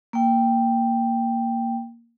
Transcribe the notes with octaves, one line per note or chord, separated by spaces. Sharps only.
A#3 G5